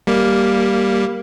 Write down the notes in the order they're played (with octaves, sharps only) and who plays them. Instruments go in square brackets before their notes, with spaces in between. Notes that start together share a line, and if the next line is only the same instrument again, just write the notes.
[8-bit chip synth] G3 A#3